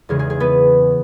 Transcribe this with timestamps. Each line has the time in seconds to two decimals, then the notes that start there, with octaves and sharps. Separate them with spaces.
0.09 E2 C#3 G#3 G#4
0.19 G#4
0.30 G#4
0.40 B3 B4